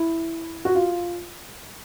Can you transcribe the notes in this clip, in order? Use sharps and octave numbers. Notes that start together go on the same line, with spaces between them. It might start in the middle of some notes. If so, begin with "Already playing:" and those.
Already playing: E4
F#4
F4